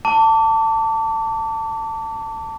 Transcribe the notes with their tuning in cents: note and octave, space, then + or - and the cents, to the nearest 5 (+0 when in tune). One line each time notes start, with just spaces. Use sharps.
A5 +20 D6 -30